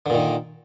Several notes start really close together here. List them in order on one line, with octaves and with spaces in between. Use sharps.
D3 A#2 D#3